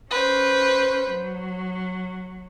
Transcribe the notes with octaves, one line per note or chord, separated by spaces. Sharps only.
C#4 B4 C5
F#3